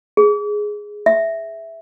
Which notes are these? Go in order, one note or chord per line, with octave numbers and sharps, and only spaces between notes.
G#4
E5